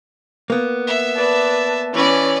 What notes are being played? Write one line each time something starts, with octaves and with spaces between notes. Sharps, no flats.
A#3 B3
E5
B4 D5 A5
E3 C#4 B4 C#5 D5